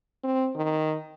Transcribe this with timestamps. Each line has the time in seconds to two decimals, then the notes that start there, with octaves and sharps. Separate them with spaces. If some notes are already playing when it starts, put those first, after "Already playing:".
0.24 C4
0.56 D#3